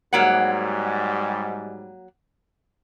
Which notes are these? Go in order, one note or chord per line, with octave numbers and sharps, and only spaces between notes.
G#2 F#3 G3 A#3 F#5